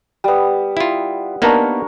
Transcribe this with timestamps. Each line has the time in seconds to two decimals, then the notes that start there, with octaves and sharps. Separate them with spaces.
0.24 G3 B3
0.77 E4 F4
1.42 A#3 B3 D4 D#4 A#4 C#5